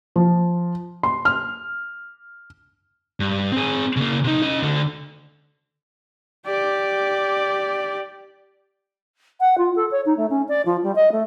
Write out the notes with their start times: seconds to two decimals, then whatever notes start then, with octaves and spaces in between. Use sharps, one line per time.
0.16 F3
1.03 C6
1.25 F6
3.20 G2
3.52 C4 G#4
3.96 C#3 A#3
4.24 C3 D#4
4.42 C#4 D#5
4.62 D2 D3
6.47 G4 D5
9.40 F#5
9.58 F4
9.76 A4
9.91 C#5
10.05 D#4
10.17 A3
10.30 C#4
10.48 D5
10.65 F3
10.83 G3
10.95 D#5
11.12 A3